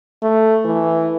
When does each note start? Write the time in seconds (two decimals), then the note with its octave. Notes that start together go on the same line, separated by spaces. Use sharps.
0.23 A3
0.65 E3